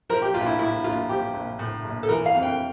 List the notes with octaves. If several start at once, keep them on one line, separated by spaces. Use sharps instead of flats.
F3 A#4
G4
A#1 F4
E4
A2 E4
A#1 F4
F3 G4
A#1
A2
A#1
A4
E3 A#4
F5
F2
G5